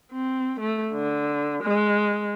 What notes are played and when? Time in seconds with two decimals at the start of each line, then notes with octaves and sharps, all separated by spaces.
0.12 C4
0.60 A3
0.93 D3
1.64 G#3